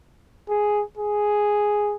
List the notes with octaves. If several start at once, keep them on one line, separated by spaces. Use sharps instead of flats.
G#4
G#4